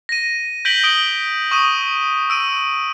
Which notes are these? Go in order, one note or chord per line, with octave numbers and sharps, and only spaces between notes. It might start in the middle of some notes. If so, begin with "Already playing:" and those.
A#6 D#7
G6 A#6 B6 D7 F#7 G7
D#6 D7 G7
C#6 D#6 D#7
E6 D7 D#7